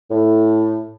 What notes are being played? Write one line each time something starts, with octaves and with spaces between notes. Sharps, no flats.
A2